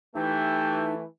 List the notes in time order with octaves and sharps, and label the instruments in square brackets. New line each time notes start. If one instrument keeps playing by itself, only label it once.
[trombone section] E3 A3 [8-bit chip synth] D#4 [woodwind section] G4 E5 G5